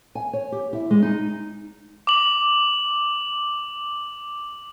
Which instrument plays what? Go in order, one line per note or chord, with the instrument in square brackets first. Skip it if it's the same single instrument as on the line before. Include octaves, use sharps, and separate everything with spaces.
[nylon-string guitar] G#5
C#5
G4
E4
G#3
D#4
[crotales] D6 F#7